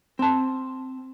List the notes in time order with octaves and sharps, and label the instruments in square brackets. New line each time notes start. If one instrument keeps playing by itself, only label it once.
[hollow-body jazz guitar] C4 A5